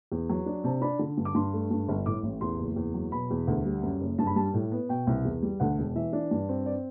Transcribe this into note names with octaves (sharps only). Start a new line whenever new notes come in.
E2
F#3
D4
C3 A5
D4 B5
D3
G2
D6
G2 C6
A3
G2
G1
A2 D6
A1
E2 C6
F#1
E2
F#3
B2 B5
E2
D2
G3
F#2
F#1
G2 A5
B5
G3 A5
A2
B3
B2 G5
C2
E2
G3
D2 F#5
E1
E3 E5
D4
G2
C4
D5